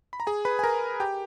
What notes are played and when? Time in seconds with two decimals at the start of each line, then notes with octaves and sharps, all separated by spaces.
0.13 B5
0.20 A#5
0.27 G#4 G#5
0.45 B4 B5
0.59 G#5
0.63 A#4 A#5
1.00 G4 G5